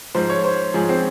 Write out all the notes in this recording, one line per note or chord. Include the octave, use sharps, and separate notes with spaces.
G#2 F3 C5
C#5
C5
G#2 F3 G#4
C4